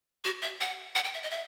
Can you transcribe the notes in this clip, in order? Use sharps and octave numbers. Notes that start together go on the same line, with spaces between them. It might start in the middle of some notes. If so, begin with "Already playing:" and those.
F#4
E5
F#5
F#5
G5
E5
D#5
E5